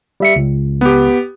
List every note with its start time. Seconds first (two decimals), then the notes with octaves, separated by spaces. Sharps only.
0.20 G3 E5 C#7
0.36 C#2
0.81 B3 G4